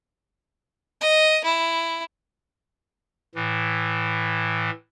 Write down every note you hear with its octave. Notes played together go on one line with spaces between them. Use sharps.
D#5
E4
A2 E3